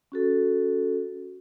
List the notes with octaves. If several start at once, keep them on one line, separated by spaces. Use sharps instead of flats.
C#4 F#4 A4